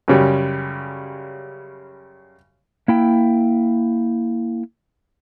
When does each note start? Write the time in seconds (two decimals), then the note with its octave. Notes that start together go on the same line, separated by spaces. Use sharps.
0.08 F#2 C#3 G3
2.88 A#3 E4 G5